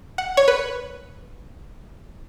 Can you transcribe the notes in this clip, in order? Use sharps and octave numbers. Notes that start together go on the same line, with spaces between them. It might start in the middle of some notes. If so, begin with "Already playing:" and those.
F#5
C#5
B4